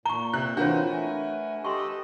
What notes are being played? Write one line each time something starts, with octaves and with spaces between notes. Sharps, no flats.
A#2 A#5 C#6 G7
C3 F#6
E3 C4 D4 F4 F#4 A#4 B4 C#5
A3 G#5
G4 A4 D#5 C6 C#6